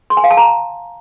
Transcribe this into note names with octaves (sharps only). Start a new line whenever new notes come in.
C6
G#5
F5
A5
A#5